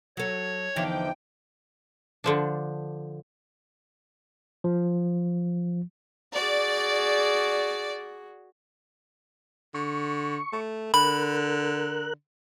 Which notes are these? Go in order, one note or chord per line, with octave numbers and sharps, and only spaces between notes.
F#3 A4 C#5
E2 D3 E3 F3 D#4 G5
D3 F3 D4
F3
F#4 G#4 D5
D3 C#6
A3
D3 A#4 B5 F#6